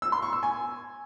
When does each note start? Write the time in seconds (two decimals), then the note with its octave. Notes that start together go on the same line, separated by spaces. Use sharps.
0.02 E6
0.12 C6
0.22 C#6
0.33 E6
0.43 G#5